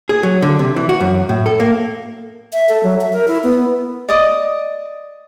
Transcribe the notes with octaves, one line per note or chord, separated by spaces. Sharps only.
G#4
F#3
D3
C3
E3
F#4
F#2
A2
A4
A#3
E5
A4
F#3
E5
A#4
E4
B3
D5 D#5 D#6